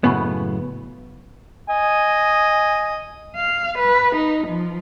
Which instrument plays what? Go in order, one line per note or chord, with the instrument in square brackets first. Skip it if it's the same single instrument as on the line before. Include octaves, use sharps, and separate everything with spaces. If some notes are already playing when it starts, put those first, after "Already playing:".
[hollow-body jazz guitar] F#2 A2 C#3 B3
[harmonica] D#5 [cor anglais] G#5
[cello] F5
B4
D#4
F3